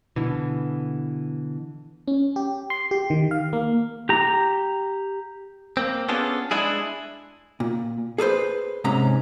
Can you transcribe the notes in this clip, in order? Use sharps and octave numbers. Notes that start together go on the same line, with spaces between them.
B2 D3 E3
C#4
G4
C6
G4
D#3
F5
A#3
G4 A#5
A#3 C4
B3 C#4 D4 F4 G#4 A4
G#3 D4 E4 G#4
A#2
G#4 A4 B4 C5
G#2 C3 C#4 A#5